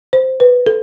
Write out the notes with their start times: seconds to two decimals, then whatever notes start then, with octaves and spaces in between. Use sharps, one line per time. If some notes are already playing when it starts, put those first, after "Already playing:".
0.13 C5
0.40 B4
0.67 A4